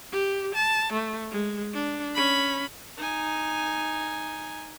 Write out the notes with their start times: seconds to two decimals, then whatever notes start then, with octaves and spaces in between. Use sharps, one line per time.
0.12 G4
0.55 A5
0.93 A3
1.31 G#3
1.73 D4
2.15 C#4 B5
2.98 D#4 G#5